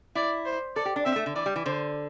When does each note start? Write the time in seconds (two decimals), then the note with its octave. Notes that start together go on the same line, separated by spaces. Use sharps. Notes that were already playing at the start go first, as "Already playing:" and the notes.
0.15 E4 D5
0.46 C5
0.76 A4 D5
0.85 G4
0.96 D4
1.05 C4 E5
1.16 A3
1.26 D3
1.35 E3 D5
1.46 G3
1.56 E3
1.66 D3 C5